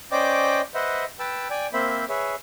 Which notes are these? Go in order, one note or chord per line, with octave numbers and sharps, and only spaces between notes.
C#4 C5 D5 D#5 G5 D6
B4 C5 D#5 E5 F#5
B4 G5 A5 E6
D5 G5 G#5
A#3 C4 C5 E5 B5
G#4 B4 C#5 E5